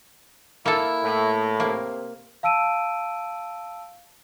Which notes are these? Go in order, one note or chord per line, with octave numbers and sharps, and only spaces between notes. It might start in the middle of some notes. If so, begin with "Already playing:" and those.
A#3 E4 A4
A2
C3 A#3
F5 A5 E6 D7 D#7